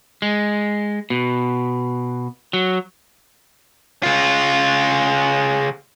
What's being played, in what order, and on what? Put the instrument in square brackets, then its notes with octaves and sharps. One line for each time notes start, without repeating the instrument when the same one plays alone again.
[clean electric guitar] G#3
B2
F#3
[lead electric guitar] C#3 F4